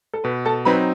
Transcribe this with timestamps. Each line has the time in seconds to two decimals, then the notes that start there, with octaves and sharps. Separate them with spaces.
0.14 A4
0.24 B2 B4
0.45 A4 A5
0.65 F#3 C4 D#4 B4 B5